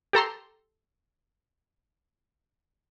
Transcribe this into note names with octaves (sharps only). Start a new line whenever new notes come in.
G4 A4 A#5 C6